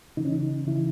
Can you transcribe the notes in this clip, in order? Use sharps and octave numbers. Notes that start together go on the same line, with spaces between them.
C#3 E3 D#4
C#4
D#4
C#3 E3 E4